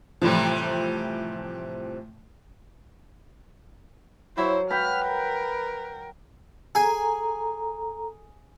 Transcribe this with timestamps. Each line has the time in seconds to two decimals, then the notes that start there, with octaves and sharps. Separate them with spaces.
0.22 A2 C3 E3 F3 G3
4.38 F#3 E4 C5
4.71 B4 F#5 G5 B5 F6
5.06 A#4
6.75 G#4 A4 G#5 A#5